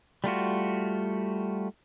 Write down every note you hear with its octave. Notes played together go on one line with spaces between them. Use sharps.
G3 A3 F4 F#4